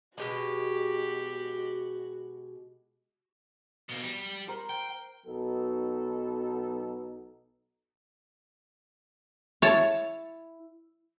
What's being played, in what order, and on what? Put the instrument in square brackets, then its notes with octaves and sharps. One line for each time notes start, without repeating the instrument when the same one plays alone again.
[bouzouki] B2 D#3 G#3 [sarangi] F#4 [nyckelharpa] G4
[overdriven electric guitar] B2 A#3
G3
[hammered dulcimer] A#4 C5
[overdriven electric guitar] G5
[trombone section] B1 F#3 B3 D#4 A4
[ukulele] E4 [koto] C#5 A5